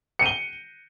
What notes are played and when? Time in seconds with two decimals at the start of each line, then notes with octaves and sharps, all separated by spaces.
0.19 C#7
0.23 D#7
0.26 G7